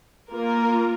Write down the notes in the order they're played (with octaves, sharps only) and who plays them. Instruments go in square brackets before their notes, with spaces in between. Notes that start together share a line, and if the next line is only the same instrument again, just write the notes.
[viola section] A#3 F4 A#4